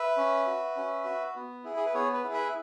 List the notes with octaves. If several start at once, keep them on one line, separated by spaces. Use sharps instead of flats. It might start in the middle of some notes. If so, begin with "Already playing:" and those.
Already playing: B4 E5
C#4
F#4
C#4
F#4
B3
E4 G#4
G#4
B4
B3 G#4 C#5
B4
E4 G#4
B4 E5